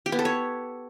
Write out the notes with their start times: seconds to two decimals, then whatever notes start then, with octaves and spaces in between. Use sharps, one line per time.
0.06 G4
0.12 B3
0.19 A4
0.25 C#5